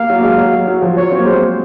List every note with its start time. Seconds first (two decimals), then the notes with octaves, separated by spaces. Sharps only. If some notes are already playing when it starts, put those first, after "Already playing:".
Already playing: A#3 F5
0.10 F#3
0.18 A#3
0.23 G#3
0.38 F#3
0.53 F#3
0.67 F#3
0.82 F3
0.97 F#3 C#5
1.12 C4
1.19 A#3
1.25 G#3 C5
1.34 A#3